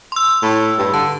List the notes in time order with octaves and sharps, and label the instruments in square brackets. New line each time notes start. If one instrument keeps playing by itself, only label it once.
[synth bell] C6 E6
[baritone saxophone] A2
G2
[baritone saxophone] D3 [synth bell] A5